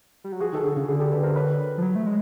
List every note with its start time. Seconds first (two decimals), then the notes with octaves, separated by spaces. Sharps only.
0.24 G3
0.32 F#3
0.40 F3 F#4 G#4
0.52 D#3 A4
0.64 D3 F#4 G#4
0.76 C#3
0.88 D3 F#4 G#4
1.00 G4 A4
1.12 A4 B4
1.23 A#4 C5
1.36 B4 C#5
1.78 F3
1.82 F#3
1.96 A3
2.06 G#3